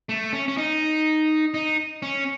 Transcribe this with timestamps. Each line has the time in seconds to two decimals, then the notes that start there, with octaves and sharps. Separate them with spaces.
0.09 A3
0.33 C#4
0.48 C#4
0.57 D#4
1.54 D#4
2.02 C#4